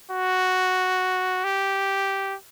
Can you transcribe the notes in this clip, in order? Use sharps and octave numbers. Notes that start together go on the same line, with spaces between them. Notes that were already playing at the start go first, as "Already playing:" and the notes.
F#4
G4